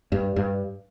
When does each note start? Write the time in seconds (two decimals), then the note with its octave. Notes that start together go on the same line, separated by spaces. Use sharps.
0.12 G2
0.36 G2